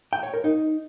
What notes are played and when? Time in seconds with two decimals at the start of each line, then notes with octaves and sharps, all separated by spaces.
0.13 G5
0.23 C#5
0.34 A#4
0.44 D#4